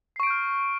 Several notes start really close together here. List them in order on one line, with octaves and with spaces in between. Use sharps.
C7 C#6 D7 G6 F6